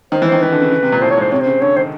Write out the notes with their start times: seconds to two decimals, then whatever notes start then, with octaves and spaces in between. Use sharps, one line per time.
0.12 D#3 C5
0.22 E3
0.27 C5
0.32 D#3
0.42 D#3 B4
0.52 D3
0.62 C#3
0.72 C#3
0.83 C3
0.92 A#2
1.01 A2 C5
1.11 C#5
1.17 G#2 C5
1.31 C3 C#5
1.40 C5
1.46 C#3
1.61 D3 C#5
1.76 D#3 C5